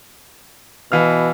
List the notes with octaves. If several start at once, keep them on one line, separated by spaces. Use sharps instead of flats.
B2 E3 F5 F6